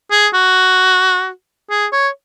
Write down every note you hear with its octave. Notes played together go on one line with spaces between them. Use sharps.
G#4
F#4
G#4
C#5